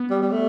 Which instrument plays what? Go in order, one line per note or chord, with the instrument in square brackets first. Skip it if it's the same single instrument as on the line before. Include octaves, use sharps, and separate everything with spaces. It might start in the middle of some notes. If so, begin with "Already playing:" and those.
Already playing: [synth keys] B3
[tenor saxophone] G3
G3
A3